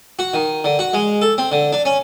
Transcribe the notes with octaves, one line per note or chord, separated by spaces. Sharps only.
F#4
D#3
D3
F#4
G#3
A4
C4
D3
D4
C#4